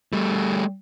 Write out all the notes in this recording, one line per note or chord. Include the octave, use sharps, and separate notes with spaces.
G3 A3